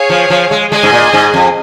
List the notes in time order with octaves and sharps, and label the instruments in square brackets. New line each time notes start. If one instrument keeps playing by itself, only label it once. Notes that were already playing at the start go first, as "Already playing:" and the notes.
Already playing: [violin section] G#4 C#5 F5
[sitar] F3
F3
G#3
[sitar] G#3 [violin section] G#4 D#5 G#5
[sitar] G#2
A#2
G#2
F2